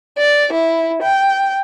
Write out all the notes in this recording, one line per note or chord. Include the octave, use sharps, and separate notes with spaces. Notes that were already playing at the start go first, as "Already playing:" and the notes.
D5
E4
G5